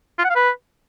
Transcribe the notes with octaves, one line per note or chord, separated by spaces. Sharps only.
F4
F#5
F5
B4